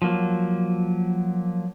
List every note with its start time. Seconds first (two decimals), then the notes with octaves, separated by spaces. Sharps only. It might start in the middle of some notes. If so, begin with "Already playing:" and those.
0.02 F3 F#3 A#3